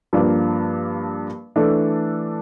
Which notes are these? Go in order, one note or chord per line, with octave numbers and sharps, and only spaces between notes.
G2 F3 A#3 D4
E3 A3 D4 A4